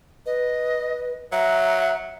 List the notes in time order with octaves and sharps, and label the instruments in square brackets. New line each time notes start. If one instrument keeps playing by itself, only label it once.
[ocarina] B4 [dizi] D#5
[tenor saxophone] F#3 [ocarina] E5 [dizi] A#5